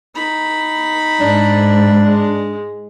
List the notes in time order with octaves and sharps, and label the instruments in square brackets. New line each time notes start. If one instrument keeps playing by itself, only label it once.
[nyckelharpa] D#4 B5
[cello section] G#2 [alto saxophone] D4
[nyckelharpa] G#3